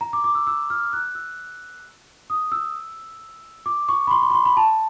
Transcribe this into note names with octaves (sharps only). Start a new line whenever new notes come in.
A#5
D6
D6
E6
E6
F6
F#6
E6
D#6
E6
D6
C#6
B5
C6
C6
B5
C6
B5
A5